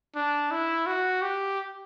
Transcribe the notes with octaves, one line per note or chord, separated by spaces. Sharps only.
D4
E4
F#4
G4